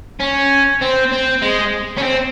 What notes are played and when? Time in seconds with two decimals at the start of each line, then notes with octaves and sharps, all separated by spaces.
0.20 C#4
0.81 C4
1.12 C4
1.42 G#3
1.98 C#4
2.03 C4